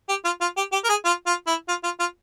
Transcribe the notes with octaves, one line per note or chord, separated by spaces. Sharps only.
G4
F4
F4
G4
G4
A#4
G#4
F4
F4
E4
F4
F4
F4